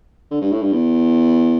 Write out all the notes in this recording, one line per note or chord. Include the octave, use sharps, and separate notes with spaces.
D3
G2
A2
G2
E2